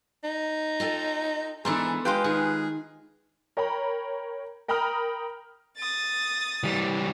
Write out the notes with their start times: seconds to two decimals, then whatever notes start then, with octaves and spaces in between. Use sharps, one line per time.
0.24 D#4
0.80 F4 A4 G5
1.65 G#2 E3 B3 D4 G#4 A4
2.05 G#3 F4 G4 B4 G5
2.24 D#3 G#4
3.57 A#4 C#5 G5 A#5 B5
4.68 A#4 G5 A#5 B5 D#6 F6
5.78 D#6 A6
6.64 E3 G3